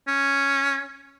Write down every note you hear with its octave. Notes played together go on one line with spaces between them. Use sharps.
C#4